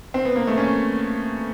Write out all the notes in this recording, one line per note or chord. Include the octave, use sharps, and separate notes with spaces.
C4
B3
A#3
A3
C#4